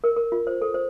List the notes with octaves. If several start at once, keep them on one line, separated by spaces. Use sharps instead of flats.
A#4
A#4
F4
C5
A4
C5